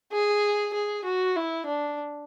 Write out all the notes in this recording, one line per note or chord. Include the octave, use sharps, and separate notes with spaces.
G#4
G#4
F#4
E4
D4